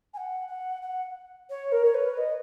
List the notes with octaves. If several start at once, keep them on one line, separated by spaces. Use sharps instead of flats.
G#5
F#5
F#5
F#5
C#5
A#4
C#5
B4
D#5